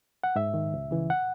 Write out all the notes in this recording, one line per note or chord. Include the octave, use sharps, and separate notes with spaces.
F#5
G#2 E5
D#3
C#2
C#3 E3
F#5